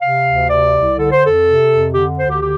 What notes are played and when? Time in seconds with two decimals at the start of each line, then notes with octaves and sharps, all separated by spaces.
0.01 C3 F5
0.25 D2
0.49 C3 D5
0.73 C2
0.97 D3 A4
1.11 C5
1.22 F2 A4
1.45 C3
1.70 F2
1.93 D3 G4
2.18 D2 C5
2.30 G4
2.42 D3 G4